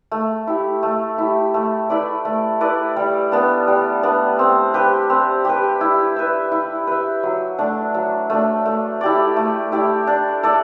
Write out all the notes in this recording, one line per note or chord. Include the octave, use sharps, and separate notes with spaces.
A3
E4 G4
A3
E4 G4
A3
E4 B4 D5
A3
E4 B4 D5
G3
B3 D4
G3
B3 D4
C4
G4 B4
C4
G4 B4
E4
B4 E5
E4
B4 E5
F#3
A3 D4
F#3
A3 D4
A3
E4 G4 D5
A3
E4 G4 D5
D4
A4 D5